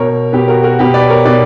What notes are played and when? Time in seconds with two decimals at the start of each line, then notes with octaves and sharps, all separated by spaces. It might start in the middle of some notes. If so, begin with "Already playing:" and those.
Already playing: B2 A#4 C#5
0.33 B2 G4 B4
0.48 F#4 A#4
0.63 F#4 A#4
0.79 B2 G4 B4
0.94 B4 D5
1.09 A#4 C#5
1.25 B2 B4 D5